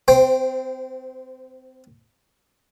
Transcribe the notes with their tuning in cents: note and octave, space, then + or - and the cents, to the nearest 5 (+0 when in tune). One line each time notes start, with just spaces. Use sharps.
C4 -30 C5 +0 G5 +0